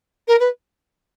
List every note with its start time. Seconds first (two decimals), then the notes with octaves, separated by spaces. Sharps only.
0.27 A#4
0.39 B4